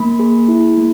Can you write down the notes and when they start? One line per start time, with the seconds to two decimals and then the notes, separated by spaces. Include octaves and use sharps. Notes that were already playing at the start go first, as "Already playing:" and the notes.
Already playing: A#3 B5
0.19 G#4
0.48 E4
0.77 A#3